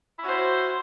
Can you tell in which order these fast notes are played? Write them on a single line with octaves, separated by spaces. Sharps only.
E4 C#4 F#4 C5